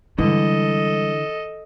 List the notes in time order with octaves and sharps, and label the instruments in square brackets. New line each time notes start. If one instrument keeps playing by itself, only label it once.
[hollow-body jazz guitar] D3 [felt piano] E3 [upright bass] G3 G#3 [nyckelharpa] A4 D#5